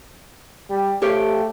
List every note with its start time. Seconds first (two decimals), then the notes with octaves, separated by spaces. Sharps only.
0.70 G3
1.02 A3 G4 C#5 F5